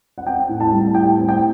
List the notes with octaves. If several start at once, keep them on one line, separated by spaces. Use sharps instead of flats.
F#5
C4 G5
A2
A5
G3
A2 G5
C4
G5